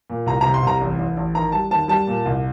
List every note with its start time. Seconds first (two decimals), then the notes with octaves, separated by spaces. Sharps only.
0.10 A#2
0.26 C2 A#5
0.41 C3 A#5
0.54 C6
0.63 C2 A#5
0.81 A1
0.99 A1
1.17 A1
1.34 D#3 A#5
1.52 G3 A5
1.71 D#2 A5
1.88 G3 A5
2.07 A#2
2.25 C2